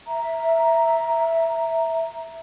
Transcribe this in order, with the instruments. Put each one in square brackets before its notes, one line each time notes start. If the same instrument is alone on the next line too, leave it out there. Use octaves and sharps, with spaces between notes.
[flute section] E5 A#5